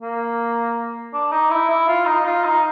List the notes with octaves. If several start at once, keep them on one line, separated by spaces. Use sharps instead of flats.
A#3
D4
D#4
E4
E4
F4
D#4
F4
D#4